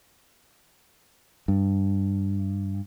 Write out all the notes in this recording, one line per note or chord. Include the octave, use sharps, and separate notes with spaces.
G2